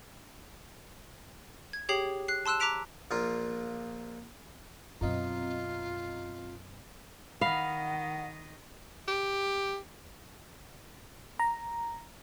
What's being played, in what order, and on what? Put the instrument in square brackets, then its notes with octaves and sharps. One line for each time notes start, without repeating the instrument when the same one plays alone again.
[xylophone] G#6
G4 G#4 C#5 G5 C7 F#7
F#6 C7
A5 C6 E6 F#6 E7
A#5 D6 F#6 B6 D7 F7
[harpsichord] A#1 A#3 D4 F4
[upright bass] F#2 B2 [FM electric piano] C4 D#5 A#5 [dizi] F4
[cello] D#3 D#5 [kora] F5 [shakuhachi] F#5 [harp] B5
[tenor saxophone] G4
[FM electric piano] A#5